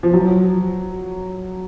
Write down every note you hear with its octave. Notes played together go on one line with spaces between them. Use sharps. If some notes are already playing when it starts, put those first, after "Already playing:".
F3
F#3